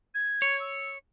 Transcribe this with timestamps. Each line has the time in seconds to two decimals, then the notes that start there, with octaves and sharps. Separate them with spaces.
0.14 G#6
0.42 C#5
0.60 E6